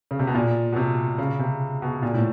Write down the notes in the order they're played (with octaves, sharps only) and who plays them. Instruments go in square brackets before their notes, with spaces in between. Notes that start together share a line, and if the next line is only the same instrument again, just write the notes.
[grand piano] C#3
C3
B2
A#2
B2
C3
C#3
C3
B2
A#2
A2